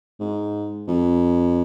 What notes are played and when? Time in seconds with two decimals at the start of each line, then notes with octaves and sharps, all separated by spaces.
0.20 G#2
0.88 F2